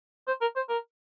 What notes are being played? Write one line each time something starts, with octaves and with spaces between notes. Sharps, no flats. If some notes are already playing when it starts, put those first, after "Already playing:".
C5
A#4
C5
A#4